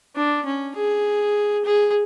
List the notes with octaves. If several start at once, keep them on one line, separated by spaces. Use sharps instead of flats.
D4
C#4
G#4
G#4